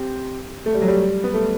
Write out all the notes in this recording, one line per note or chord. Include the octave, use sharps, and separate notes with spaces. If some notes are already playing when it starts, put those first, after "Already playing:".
Already playing: C4 G4
A3
G3
F#3
G3
B3
A3